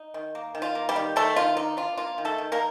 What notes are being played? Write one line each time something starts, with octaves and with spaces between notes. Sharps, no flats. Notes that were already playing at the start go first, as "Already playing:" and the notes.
Already playing: D#4
D#3
A#3
D#3
F4
A#3
G3 G4
D#3
D#3 A3 A4
D#3 F4
D4 D#4
D4 F4
A#3 F4
D#3
A3 A4
D#3
A#3 A#4